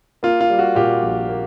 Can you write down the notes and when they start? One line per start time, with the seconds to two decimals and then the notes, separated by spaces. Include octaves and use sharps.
0.23 A#3 F4
0.41 F4
0.50 G3
0.59 F#4
0.75 A#2 F4 G4
1.03 A#1
1.29 A#3